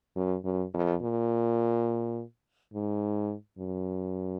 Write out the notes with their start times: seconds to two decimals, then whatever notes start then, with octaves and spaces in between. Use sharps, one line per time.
0.16 F#2
0.44 F#2
0.74 F2
1.02 A#2
2.74 G#2
3.58 F#2